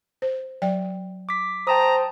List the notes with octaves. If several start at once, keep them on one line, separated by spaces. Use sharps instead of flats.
C5
F#3 D5 G5
D6 B6
C5 G5 A5 A#5 D#6